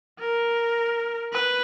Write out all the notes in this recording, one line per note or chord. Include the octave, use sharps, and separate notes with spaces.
A#4
B4